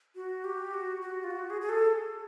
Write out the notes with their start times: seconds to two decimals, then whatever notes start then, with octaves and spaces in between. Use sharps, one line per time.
0.15 F#4
0.44 G4
0.74 F#4
1.01 F#4
1.24 F4
1.31 F#4
1.50 G#4
1.61 G#4
1.69 A4